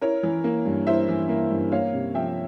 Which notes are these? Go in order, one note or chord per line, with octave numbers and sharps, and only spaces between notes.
E4 A#4 C#5
E3
A#3
G2
E4 C5 E5
E3
A#3
G2
A#3 C#5 F5
C3
F3 E5 G5